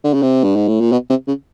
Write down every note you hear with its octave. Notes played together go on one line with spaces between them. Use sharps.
D3
C#3
C3
G2
G#2
A2
A#2
B2
C3
C#3